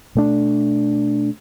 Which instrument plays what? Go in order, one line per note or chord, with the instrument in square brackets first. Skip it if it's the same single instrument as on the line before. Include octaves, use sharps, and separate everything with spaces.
[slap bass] B2 A3 D4